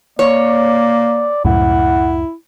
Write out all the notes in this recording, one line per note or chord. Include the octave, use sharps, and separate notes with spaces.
A#3 C#5 D5
C#2 F#2 A2 E4 F#5